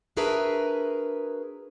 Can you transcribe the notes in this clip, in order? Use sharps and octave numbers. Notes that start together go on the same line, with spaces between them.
D4 F#4 G#4 A#4 B4 E5